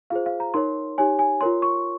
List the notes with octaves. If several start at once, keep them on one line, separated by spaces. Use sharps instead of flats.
F4 G#4 C5 F5
F5
A#5
D#4 A#4 C#5 C6
D#4 G4 C#5 G#5
G#5
F4 A#4 C#5 C6
C#6